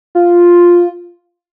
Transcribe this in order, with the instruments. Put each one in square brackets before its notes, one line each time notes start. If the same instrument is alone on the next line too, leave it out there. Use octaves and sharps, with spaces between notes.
[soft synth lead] F4